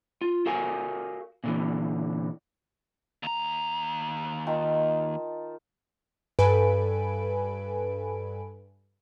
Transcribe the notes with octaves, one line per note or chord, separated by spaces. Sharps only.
F4
F#4 A4 A#4 F5 G#5
A#2 D3 E3
D#2 A#5
D#3 F4 A5
G2 A4 B4 G#5 B5 D7